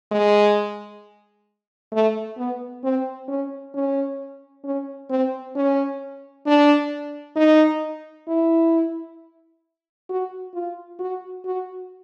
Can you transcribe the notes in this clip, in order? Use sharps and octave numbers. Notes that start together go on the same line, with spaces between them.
G#3
A3
B3
C4
C#4
C#4
C#4
C4
C#4
D4
D#4
E4
F#4
F4
F#4
F#4